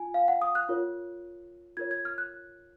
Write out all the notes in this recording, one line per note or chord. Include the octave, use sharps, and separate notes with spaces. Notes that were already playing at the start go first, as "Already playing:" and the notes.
Already playing: F4 G#5
F5
F#5
D#6
F#6
F4 A#4 C#5
F4 A#4 C#5 G#6
G#6
F6
F#6